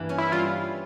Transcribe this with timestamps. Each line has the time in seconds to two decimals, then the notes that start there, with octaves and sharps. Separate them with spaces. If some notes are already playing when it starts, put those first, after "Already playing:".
Already playing: G2 E3 A#3
0.09 C#4
0.18 E4
0.32 G3 F4